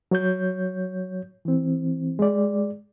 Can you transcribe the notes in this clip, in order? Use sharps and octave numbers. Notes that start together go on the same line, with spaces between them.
F#3 C#5 G6
E3 C4
G#3 D5